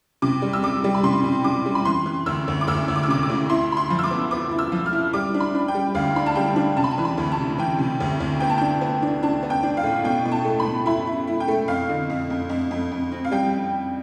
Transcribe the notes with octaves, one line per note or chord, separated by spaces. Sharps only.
C3 D6
G3
E6
G3 D6
G3
B5
C3 C6
C3
C3 D6
G3
B5
E3 C6
E3
D2 E6
D2
D6
D2 E6
D2
D6
E6
C3 D6
D6
D2
E4 C6
E4 B5
C6
F3
E6
D6
B3
B3 D6
E4
E6
F3
F6
E4
G3 D6
D4
B5
D4
G5
G3
D2 F5
D4 B5
A5
G3 G5
D4
C3 A5
B5
A5
E3
B5
D2
A5
C3
E3 G5
C3
D2
D2
B3 G5
A5
D4 G5
B3
D4
D4 A5
B3
G5
D4
F5
A2
B2 G5
B2
A5
A3
B5
B2
E4 B5
E4
E4
G5
A3
F2 F5
D3
F2
F2
F2
F2
F2
C4
F5
G3 G5